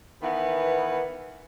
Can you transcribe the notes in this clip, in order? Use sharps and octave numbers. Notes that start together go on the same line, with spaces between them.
D#3 E3 B3